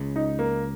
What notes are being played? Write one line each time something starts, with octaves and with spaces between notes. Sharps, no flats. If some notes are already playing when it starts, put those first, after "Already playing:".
Already playing: C#2 C#3
D#4
A#3